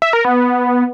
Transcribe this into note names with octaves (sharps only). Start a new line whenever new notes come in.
E5
A#4
B3